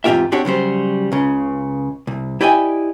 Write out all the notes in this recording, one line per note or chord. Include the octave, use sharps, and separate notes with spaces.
E2 G#2 C4 F4 G4 E5
C4 D4 F#4 G4 C#5
C#3 F#3 G3 C5
C#2 C#3
C2
E4 G4 D5 D#5 G5 G#5